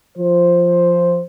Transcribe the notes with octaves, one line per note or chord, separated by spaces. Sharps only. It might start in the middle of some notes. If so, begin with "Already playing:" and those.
F3 C5